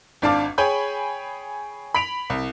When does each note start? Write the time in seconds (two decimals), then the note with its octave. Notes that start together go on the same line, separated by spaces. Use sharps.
0.22 G#1 D4 F5 A5 D6
0.58 G#4 C#5 G5 G#5 B5 G6
1.94 B5 B6 D7 F7
2.30 C2